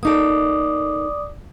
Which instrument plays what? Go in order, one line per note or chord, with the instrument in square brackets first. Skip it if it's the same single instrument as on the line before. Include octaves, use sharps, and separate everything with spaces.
[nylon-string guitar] A#3 D#4 A4 [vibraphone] D5 D6 D#6